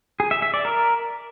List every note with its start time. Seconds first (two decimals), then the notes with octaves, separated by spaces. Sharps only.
0.20 G#4
0.31 E5
0.42 E5
0.54 D5
0.65 A#4